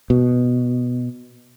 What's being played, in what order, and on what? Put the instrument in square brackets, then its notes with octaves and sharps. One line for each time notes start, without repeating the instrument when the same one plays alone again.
[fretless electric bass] B2